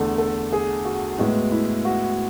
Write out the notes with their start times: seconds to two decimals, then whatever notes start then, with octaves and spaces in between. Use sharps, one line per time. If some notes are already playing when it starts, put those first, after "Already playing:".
Already playing: E2 D3 A3 A4
0.18 A4
0.53 G#4
0.85 F#4
1.18 A2 G#3 B3 F#4
1.52 E4
1.85 F#4